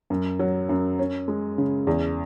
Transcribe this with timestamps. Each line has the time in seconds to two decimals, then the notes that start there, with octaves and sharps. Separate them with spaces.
0.10 F#2
0.39 F#3
0.69 F#2
0.99 C#4
1.28 G#3
1.58 C#3
1.87 E2